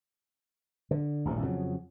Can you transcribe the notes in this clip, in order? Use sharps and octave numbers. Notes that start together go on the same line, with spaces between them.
D3
D#1 A1 G2
F2 C#3 F#3